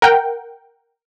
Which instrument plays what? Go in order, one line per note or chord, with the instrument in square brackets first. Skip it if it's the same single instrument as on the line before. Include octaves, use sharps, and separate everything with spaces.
[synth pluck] A#4 F#5 G5